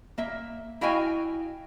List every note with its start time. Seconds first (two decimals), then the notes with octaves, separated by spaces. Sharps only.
0.18 A#3 E5
0.81 E4 F#4 D#5 F5 G5 G#5